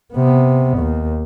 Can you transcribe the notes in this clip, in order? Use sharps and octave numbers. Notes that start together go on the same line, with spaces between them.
C3 B3
D#2